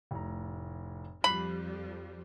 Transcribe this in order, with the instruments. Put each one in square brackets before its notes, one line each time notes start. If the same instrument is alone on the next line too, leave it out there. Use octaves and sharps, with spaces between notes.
[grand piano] F1 A2 A#5
[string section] F2 F3 G3 [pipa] B5 [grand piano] F#6 C7